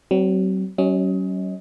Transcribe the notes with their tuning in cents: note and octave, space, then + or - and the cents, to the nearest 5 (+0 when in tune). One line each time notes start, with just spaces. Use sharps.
F#3 +40 C4 +0
F#3 +40 C#4 +0 D#5 +25